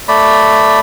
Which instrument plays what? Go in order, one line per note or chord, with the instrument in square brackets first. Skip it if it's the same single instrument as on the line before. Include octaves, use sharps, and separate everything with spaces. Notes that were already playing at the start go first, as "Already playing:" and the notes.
[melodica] A3 D5 B5